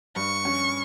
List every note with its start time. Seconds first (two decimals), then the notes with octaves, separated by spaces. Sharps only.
0.16 G2 C#6
0.45 C#4